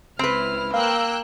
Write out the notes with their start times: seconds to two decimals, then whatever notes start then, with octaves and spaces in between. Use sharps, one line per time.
0.19 C#2 C4 E4 B4 F6
0.74 A#3 F5 G5 E6 F#6